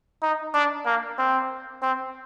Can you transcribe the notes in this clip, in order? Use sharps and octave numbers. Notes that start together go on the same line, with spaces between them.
D#4
D4
A#3
C4
C4